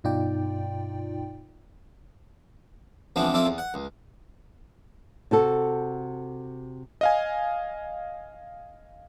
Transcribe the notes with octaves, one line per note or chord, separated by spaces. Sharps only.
G2 B2 D#4 F4 D5 G5
C#2 E3 F3 B3 C4 D4
F2 C4 E4 F4 D5
E2
F#5
C#2
C3 F#4 A4
D#5 F5 G#5